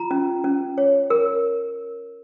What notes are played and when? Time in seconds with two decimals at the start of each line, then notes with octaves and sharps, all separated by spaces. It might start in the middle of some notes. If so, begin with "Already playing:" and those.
Already playing: F4 A#5
0.11 C#4
0.44 C#4
0.78 C#5
1.10 A#4